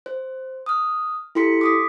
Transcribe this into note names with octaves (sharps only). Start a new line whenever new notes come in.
C5
D#6 F6
E4 G4 A4 C6 B6 C#7
D6 D#6 B6